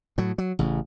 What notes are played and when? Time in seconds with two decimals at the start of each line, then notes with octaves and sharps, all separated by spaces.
0.18 A2 F#3
0.38 F#3
0.59 A1 C#3